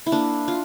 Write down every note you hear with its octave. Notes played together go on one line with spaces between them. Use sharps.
E4
A#3 D4
F4